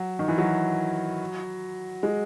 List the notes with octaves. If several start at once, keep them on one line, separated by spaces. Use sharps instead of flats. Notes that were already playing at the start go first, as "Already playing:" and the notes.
Already playing: F#3
D#3
E3
F#3
G#3